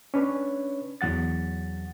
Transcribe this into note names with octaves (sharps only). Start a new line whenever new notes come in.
C#4 D4 B4 C#5
E2 F#3 F#5 A6